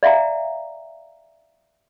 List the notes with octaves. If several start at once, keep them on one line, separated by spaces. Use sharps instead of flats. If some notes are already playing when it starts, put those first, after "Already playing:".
D5 E5 F5 G5 A#5